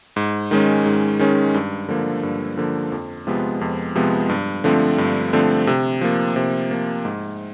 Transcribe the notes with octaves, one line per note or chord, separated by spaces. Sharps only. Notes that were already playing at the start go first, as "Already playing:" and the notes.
G#2
D#3 G#3 C#4
G#2
D#3 G#3 C#4
G2
D3 F3 A#3
G2
D3 F3 A#3
F2
C3 F3 G#3 B3
F2
C3 F3 G#3 B3
G2
D3 F3 A3 C4
G2
D3 F3 A3 C4
C3
F3 A#3
C3
F3 A#3
G#2